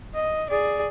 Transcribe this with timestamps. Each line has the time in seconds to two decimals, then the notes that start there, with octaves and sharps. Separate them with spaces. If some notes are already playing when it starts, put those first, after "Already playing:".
0.14 D#5
0.50 G#4 D5